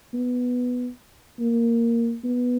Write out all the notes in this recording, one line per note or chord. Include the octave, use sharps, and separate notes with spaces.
B3
A#3
B3